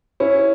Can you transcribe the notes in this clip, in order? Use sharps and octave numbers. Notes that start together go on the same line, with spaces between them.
C#4 E4